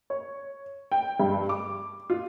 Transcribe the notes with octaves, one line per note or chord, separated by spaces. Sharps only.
C#5
G5
G2
D6
F4